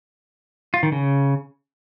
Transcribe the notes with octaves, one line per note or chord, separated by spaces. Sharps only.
F4
D#3
C#3